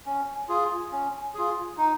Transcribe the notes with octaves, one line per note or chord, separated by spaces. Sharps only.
C#4
F4 G#4
C#4
F4 G#4
D#4